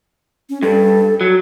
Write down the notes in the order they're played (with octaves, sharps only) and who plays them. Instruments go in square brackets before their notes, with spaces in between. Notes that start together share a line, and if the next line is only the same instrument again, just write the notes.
[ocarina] C#4
[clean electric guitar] G2 [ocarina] A4
[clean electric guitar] F#3